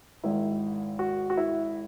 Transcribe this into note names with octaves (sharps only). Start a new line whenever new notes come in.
G#1 G#2 D#3 E4
F#4
F#4
E4